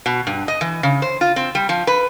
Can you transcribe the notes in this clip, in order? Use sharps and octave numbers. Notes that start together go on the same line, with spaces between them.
B2
G2
D#5
E3
C#3
C5
F4
C4
G3
F3
B4